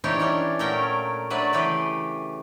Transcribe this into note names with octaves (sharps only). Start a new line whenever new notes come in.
E3 C4 D4 D#4 G4 C#5
E3 C#4 D4
A#2 F#3 A3 C#4 A#4 G5
F#3 A3 D4 B4 D5
C#3 E3 G4 B4